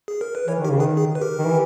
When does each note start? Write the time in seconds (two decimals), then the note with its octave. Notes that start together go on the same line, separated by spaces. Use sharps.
0.08 G#4
0.21 A#4
0.35 B4
0.47 E3 A#4 C#5
0.59 D#3
0.65 G4 A#4
0.69 C#3
0.80 D#3 G#4 B4
0.97 G#4
1.15 B4
1.21 G4 A#4
1.39 D#3
1.46 E3